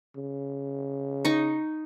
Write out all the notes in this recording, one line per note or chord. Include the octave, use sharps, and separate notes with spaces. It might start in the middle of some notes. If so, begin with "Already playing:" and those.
C#3
D#4 C#6